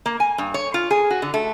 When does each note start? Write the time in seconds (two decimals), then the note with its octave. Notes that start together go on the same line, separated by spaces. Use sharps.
0.06 A#3
0.20 G#5
0.38 G2
0.54 C#5
0.74 F4
0.91 G#4
1.11 F#4
1.22 D3
1.34 A3